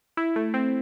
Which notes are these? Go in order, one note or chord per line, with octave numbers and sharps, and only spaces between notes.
E4
A3
C4